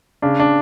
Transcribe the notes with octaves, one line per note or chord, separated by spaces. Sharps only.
C#3 D4
D4